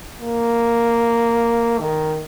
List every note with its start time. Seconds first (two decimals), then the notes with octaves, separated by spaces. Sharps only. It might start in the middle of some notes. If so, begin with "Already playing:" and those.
0.20 A#3
1.79 D#3